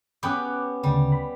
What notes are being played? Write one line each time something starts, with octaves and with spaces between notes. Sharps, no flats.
B3 C#4 G4 D6 F#6
D2 C#3 G3
B5